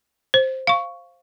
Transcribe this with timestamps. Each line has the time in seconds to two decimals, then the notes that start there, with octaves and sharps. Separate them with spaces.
0.34 C5
0.67 F5 C#6